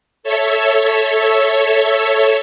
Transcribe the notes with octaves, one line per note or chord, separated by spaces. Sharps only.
A4 C#5 E5